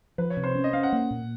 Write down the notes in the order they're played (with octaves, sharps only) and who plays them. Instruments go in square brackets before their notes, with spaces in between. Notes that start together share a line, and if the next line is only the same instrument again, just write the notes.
[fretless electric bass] F3 [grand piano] B4
[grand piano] C#5
[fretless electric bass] C3
[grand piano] C5
[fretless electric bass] C#4
[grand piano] D#5
[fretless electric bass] C#4 [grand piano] F5
[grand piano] F#5
[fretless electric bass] A#3
A#2